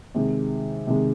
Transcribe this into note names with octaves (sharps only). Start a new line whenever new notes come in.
C3 D#3 G#3
C3 D#3 G#3